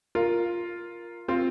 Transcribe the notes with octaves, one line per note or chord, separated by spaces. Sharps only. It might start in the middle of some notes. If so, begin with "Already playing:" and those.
F4 A#4
C4 F4